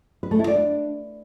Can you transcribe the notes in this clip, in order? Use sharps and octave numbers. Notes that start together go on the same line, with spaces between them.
B4
A3
E4
D5
D4